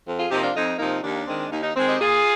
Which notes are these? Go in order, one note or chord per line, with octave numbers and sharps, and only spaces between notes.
F2
F4 G#4
C3 F3 A#3 D#4 G4
D4 F4
F2 D#4
C3 F3 A#3 D#4
D#2 D4
D#3 G#3 C4
D#2 D#4
D#4
D#3 G#3 C4
D#4 G4
A#2 F4 G#4